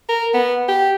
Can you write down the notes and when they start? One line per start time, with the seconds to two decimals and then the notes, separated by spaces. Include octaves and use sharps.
0.09 A#4
0.34 B3
0.68 G4